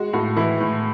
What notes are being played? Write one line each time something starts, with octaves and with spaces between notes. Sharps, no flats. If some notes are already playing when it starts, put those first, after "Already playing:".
Already playing: G#3 F#4
A2 F#4
E3 E4
A2